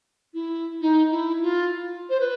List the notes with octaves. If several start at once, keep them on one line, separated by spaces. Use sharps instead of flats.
E4
D#4
E4
F4
C5
B4